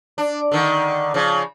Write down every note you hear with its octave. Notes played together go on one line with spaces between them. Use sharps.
D4
D3 D#3
C#3 F3